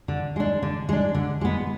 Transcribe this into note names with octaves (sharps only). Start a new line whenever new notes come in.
D3
G#3 D4
D3
G#3 D4
D3
G#3 B3